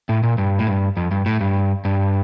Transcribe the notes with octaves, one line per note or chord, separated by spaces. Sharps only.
A2
A#2
G2
A2
G2
F2
G2
A2
G2
G2